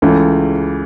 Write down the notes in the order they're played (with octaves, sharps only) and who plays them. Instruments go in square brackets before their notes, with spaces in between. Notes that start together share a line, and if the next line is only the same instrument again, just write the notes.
[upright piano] C#2 C#3 E3 A3